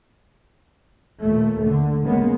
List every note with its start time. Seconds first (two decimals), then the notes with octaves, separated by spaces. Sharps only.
1.21 D#2 A#2 A3
1.66 D3
2.05 C#3 G#3 A#3 B3